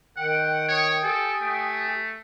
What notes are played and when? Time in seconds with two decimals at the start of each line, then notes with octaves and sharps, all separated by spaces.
0.17 D#3 F#5 G5
0.68 C#5 G5 D#6
1.03 G4 A4 G#5
1.41 A3